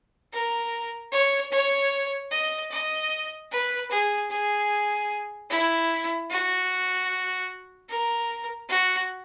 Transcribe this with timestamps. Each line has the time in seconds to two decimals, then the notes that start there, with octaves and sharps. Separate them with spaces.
0.32 A#4
1.12 C#5
1.52 C#5
2.31 D#5
2.71 D#5
3.51 B4
3.90 G#4
4.30 G#4
5.50 E4
6.29 F#4
7.89 A#4
8.69 F#4